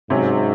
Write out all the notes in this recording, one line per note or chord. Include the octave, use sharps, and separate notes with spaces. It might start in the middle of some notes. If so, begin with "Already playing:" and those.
G#2 C3 F#3 C#4